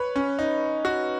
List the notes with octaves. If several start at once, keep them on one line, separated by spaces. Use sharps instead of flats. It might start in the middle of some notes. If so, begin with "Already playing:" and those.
Already playing: B4 C#5
C#4
D#4
F#4